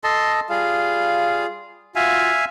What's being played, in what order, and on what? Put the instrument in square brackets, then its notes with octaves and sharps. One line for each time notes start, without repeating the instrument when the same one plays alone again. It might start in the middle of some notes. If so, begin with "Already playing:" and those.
[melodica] A4 D#5 A5 [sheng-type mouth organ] C6
[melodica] G3 [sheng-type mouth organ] F4 G#4 F5
[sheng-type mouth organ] F4 F#4 [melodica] E5 F5 G#5